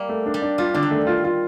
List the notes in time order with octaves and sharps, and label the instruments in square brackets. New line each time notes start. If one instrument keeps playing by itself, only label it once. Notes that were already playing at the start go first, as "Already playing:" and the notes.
Already playing: [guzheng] G3 A#3
[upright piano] A3
D4
[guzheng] G3
[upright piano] D4
[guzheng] G3 [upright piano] F4
[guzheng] D3 [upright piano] D4
[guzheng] D#3
[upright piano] A3
F4
F4